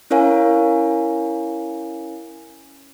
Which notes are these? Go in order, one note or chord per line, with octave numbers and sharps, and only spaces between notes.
C#4 E4 A#4 C#5 F5 G#5